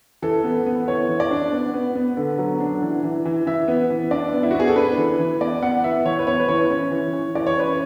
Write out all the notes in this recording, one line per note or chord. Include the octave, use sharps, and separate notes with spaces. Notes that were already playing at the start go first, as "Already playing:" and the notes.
E3 A4
B3
B3
E3 C#5
E3
D5
D4
B3
B3
B3
D3
F#3
D4
E3
E3
E3
E3 E5
B3
E3
D4 D5
B3
E4
F#4
B3
G#4
A4
D4 B4
E3
E3
B3 D5
B3 F#5
E3 E5
E3 C#5
B4
B3 C#5
B4
E3 C#5
C#4
E3
E3
E3 D5
C#5
C#4 B4